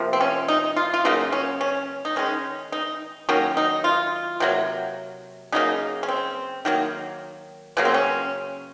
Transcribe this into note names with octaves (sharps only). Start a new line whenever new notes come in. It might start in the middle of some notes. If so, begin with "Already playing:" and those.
Already playing: C3 F3 A#3
C4
C#4
D#4
F4
F4
C#3 F#3 A#3 D#4
C#4
C#4
D#4
D#3 G#3 C#4
D#4
D#3 F#3 A#3 C#4
D#4
F4
C3 F#3 A#3
C#3 F#3 A#3 D#4
C#4
C4
D#3 F#3 A#3
C#3 F#3 A#3 C#4
C4
C#4